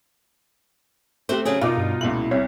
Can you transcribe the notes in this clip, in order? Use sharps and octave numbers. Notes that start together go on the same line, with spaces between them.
A3 C4 F#4 G4 C5
C#3 F#3 G#4
B2 D#4 F4 A#4 D6
G2
C#2 A#2 E4 F#7
C2 E4 C#5